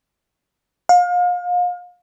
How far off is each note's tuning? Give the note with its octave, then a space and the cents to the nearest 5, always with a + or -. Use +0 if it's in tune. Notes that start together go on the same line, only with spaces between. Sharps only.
F5 +35